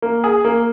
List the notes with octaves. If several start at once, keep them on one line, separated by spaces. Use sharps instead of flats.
A#3
G#4
A#3